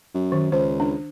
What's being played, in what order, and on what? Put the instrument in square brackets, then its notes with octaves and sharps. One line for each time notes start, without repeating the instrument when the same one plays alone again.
[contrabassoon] F#2
[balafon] D#3
[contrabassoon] C#2 [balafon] C5
[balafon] D4